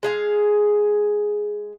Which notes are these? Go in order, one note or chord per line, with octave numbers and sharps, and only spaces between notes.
G#3 G#4 F5